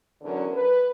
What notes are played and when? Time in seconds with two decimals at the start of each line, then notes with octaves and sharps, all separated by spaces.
0.21 E2 D3 F#3 C#4 A#4
0.53 B4